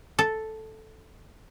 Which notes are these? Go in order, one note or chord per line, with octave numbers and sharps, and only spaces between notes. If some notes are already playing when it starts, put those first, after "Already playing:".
A4